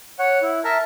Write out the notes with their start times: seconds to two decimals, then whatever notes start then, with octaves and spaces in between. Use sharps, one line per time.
0.19 C#5 F#5
0.42 E4
0.64 A#4 E5 A5 A#5